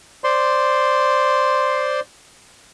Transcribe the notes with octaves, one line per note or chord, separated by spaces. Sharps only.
C5 D5 C6